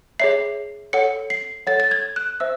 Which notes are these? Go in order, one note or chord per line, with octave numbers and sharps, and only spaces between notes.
G#4 C#5 E5 C7
A4 C#5 F#5 C#7
C7
A4 C#5 F#5 A6
A6
G#6
F#6
C5 E5 E6